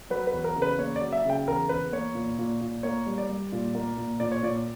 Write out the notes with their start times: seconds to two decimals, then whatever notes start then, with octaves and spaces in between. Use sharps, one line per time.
0.10 F#3 B4
0.27 B4
0.33 E2
0.44 A#4
0.56 C#3
0.62 B4
0.79 A#3 C#5
0.96 D5
1.01 F#3
1.12 E5
1.25 C#3 G5
1.47 E2 A#4
1.69 E2 B4
1.92 A#3 C#5
2.15 A#2
2.38 A#2
2.61 A#2
2.83 A#3 C#5
3.06 G3
3.18 D5
3.29 G3
3.52 A#2
3.75 A#3
3.97 A#2
4.20 A#2 D5
4.32 C#5
4.43 A#2 D5